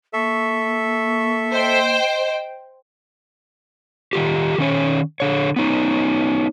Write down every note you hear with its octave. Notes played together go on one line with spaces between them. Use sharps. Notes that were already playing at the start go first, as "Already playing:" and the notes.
A#3 A4 E5 C#6
C5 D#5 G5
D#3 E3 F4 G4
D#3 C#4 C#5
D3 C#5
B3 C#4 D#4